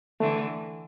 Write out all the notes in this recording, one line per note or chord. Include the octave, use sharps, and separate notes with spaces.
D3 E3 A3